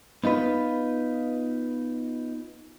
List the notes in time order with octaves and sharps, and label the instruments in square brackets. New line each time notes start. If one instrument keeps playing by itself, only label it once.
[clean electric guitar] B3 D#4 F4 B4